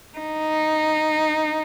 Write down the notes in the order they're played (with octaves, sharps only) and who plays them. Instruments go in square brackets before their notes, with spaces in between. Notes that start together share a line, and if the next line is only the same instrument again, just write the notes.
[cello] D#4